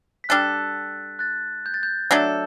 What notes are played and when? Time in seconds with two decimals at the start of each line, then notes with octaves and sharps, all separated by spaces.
0.24 B6
0.29 G3 D4 A4 F#6 A6
1.19 F#6 A6
1.66 G6
1.74 A6
1.83 G6
2.11 F#3 A3 D4 A4